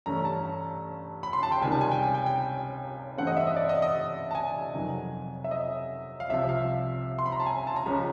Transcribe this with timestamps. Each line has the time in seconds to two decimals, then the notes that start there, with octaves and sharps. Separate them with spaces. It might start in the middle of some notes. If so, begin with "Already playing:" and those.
0.06 G2 E3 A3 C#4 A#5
0.25 A5
0.45 A#5
1.23 B5
1.33 C6
1.43 A5
1.52 G5
1.62 C#2 C3 D#3 G3 G#5
1.72 A5
1.81 G#5
1.91 G5
2.03 G#5
2.14 G5
2.26 G5
3.17 G2 E3 A3 C4 F#5
3.27 D#5
3.37 E5
3.47 D#5
3.56 D5
3.69 D#5
3.82 D#5
4.31 A5
4.35 G#5
4.74 F2 C3 D#3 F#3
5.44 E5
5.51 D#5
6.20 F5
6.29 C2 C3 F3 E5
6.49 F5
7.19 C6
7.26 B5
7.32 A#5
7.40 A5
7.46 G#5
7.67 A5
7.76 A#5
7.86 C#2 C#3 F3 G#3 C#4